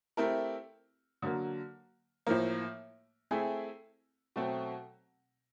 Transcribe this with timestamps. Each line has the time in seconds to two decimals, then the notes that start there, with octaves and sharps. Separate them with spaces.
0.17 A3 C4 E4 G4 A#4
1.22 D3 F#3 A#3
2.27 A2 F3 A#3
3.31 A3 C4 E4 G#4
4.36 B2 F#3 A3 C4